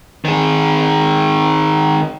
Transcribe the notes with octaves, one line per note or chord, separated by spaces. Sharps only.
D#3 G#4